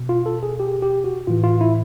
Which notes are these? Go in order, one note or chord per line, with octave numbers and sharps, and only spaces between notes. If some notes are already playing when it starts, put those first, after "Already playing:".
Already playing: B2
F4
A4
G#4
G4
G4
F#4
A2 E3 F4
F4
E4